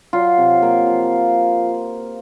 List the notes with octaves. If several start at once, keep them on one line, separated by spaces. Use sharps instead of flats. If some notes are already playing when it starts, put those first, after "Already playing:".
F#3 F4
C3
A#3
F3